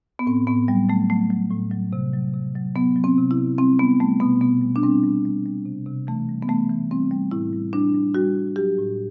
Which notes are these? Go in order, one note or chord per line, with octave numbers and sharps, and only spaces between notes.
B3
A2 C4
A2 B3
F#3 G3
F#3 A3
F#3 A3
F#3
A2
F#3
C3
F#3
C3
F#3
F#3 B3
F#3
C4
C3
E4
C3
G3 C4
G3 B3
G3 A3
B2 B3
B2 B3
G3
D4
G3 C4
G3
G3
G3
C3
C3
E3 A3
G3
B3
E3 A3
E3
G3 C4
G3
A2 E4
G3
G3 D4
G3
G3 F#4
G3
F#3 G4
A2